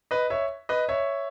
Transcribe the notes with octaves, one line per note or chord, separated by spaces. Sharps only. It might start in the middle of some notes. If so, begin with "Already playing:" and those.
B4 D#5
C#5 E5
B4 D#5
C#5 E5